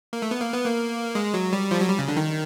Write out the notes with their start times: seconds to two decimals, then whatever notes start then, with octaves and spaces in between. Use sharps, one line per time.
0.13 A#3
0.22 A3
0.31 B3
0.41 A#3
0.53 B3
0.66 A#3
1.15 G#3
1.34 F#3
1.53 G3
1.71 F3
1.81 F#3
1.89 G3
1.99 C#3
2.08 D3
2.17 D#3